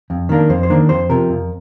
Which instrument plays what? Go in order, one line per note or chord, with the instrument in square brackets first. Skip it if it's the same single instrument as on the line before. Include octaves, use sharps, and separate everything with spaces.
[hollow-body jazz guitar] F2
D#3 A#3 D4
F2 C5
C5
D#3 A#3 D4
F2 C5
C3 F3 A#4
F2